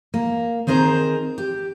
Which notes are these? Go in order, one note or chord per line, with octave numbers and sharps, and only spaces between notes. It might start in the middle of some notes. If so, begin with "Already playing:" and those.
A#3
D#3 C4 G#4 A#4 C5
G4